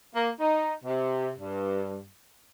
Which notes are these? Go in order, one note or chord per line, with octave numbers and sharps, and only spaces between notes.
A#3
D#4
C3
G2